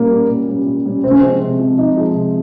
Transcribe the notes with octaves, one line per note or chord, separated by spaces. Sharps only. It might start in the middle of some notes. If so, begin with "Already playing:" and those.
Already playing: A#2 G3 A#3 C#4
G3 C#4
A#2
G3 C#4
A#2
G3 C#4
C3 C4
C#4
F3 G#3 C4
C3
F3 G#3
C3 D#4
F3 G#3
C3